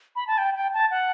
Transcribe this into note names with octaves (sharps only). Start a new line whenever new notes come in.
B5
A5
G5
G5
A5
F#5